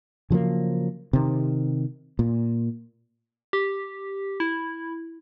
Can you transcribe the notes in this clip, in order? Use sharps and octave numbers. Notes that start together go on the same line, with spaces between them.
C#3 F3 F#3 A#3
C3 D#3
A#2
G4
E4